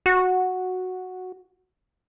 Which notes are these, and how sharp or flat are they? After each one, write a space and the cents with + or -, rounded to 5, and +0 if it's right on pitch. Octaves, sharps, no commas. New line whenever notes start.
F#4 -5